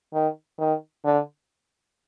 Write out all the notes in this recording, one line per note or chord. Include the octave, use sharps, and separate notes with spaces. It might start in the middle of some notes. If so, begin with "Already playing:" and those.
D#3
D#3
D3